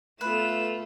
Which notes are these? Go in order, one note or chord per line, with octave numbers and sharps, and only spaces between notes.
A3 B3 F4 A4 B4 E7